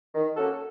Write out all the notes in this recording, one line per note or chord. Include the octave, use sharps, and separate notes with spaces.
D#3
A#3 C#4 F#4 A4